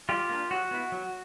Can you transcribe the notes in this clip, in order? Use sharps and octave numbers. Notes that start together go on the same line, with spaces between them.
G3 F4 G4
A#3 D4
F#3 F#4
B3 E4
F#3